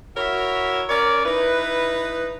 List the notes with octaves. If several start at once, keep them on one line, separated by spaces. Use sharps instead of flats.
E4 F#4 A#4 C#5 E5
C#4 A#4 C#5 D5
D#4 E4 B4